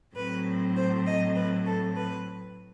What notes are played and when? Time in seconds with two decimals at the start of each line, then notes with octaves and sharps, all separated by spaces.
0.16 A2 F#3 C4 B4
0.76 C5
1.06 D#5
1.36 B4
1.66 A4
1.96 B4